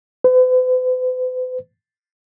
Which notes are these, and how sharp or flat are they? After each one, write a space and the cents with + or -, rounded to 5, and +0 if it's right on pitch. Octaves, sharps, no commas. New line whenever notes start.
B4 +45